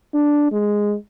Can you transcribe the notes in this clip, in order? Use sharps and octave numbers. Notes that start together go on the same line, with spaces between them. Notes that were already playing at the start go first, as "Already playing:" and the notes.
D4
G#3